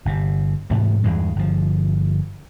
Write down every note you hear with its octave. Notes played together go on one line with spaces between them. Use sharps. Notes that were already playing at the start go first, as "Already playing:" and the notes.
G1 C3
G#2 C3 E3 A3
E2 G2 E3 G#3
G1 F3